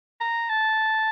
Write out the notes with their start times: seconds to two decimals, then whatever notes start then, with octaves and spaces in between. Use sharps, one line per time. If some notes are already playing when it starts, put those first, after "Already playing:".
0.21 A#5
0.50 A5